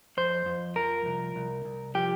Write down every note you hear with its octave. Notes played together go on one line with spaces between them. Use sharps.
F2 C5
F2
F3 A#4
C2
C2
C2
F3 G4